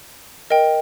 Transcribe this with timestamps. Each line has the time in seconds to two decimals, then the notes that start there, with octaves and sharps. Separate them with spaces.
0.50 A#4 D#5 G5